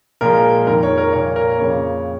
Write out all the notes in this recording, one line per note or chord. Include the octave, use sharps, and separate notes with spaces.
A#2 F3 G#3 A#4
F2 D#3 G#3 A#4
C#5
A#4
A#2 A#3 C#5
A#4
F2 C#3 A#3 C#5